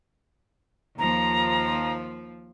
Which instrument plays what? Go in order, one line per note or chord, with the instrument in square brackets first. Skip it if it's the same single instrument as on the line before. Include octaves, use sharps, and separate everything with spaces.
[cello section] D#2 F3 [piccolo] A#5